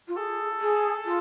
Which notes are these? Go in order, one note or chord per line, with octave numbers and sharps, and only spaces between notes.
F4
G#4 A4
G#4
F4